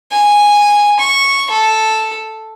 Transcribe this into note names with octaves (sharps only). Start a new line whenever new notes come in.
G#5
C#6
A4